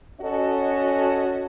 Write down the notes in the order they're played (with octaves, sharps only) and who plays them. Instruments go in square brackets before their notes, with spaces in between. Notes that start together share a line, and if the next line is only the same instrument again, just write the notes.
[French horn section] C#4 F#4 A4 D#5